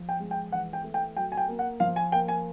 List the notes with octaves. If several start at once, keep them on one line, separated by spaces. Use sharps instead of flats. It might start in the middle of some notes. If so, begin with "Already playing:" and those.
Already playing: F3
G5
G#3
G5
E3 F#5
G5
A3
G5
F#3 G5
G#5
G5
A#3
F#5
F3 F5
G#5
A#3 G5
G#5